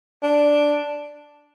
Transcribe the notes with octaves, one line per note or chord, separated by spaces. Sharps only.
D4